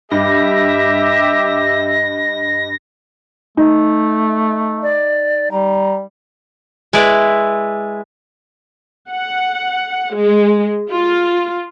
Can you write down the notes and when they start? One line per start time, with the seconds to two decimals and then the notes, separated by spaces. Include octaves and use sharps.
0.11 G2 G4 D#5 E5 A#6
3.57 A3 D#4
4.83 D5
5.52 G3 A#5
6.93 G#3 E4 B4 D5
9.09 F#5
10.15 G#3
10.91 F4